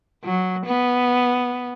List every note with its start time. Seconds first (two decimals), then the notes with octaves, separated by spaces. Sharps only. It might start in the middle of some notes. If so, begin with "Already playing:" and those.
0.24 F#3
0.66 B3